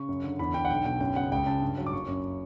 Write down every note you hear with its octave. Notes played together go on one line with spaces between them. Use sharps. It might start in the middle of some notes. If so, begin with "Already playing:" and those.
Already playing: C#3 C#6
F#2
D3
E2 B5
D3 G5
F#5
B1 G5
B2 G5
F#2 G5
C#3 F#5
C#2 G5
C#3 A5
G2
F#3
D6
F#1 C#6
F#2